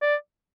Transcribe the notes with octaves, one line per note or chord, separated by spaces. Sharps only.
D5